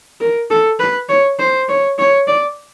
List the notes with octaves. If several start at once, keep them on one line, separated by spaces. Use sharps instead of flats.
A#4
A4
B4
C#5
C5
C#5
C#5
D5